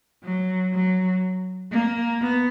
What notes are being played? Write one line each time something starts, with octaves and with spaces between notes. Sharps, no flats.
F#3
F#3
A#3
B3